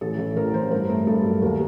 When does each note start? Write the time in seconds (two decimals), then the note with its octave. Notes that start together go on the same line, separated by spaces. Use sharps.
0.01 A1 A4
0.19 A1
0.37 A1 A#4
0.54 A1 C5
0.71 G2 A#4
0.89 A3
1.07 G2 A4
1.25 F#3
1.42 D#2 A#4